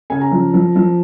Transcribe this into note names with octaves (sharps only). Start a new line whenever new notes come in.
C#3 G#5
A#5
F3
F3
F3